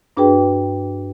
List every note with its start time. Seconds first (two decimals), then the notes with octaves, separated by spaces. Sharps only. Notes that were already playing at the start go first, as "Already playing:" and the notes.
0.17 G2 D4 F#4 G#4 B4 G5